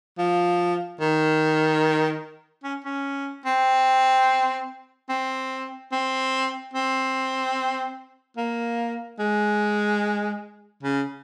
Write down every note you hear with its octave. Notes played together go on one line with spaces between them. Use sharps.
F3
D#3
C#4
C#4
C4
C4
C4
C4
A#3
G#3
C#3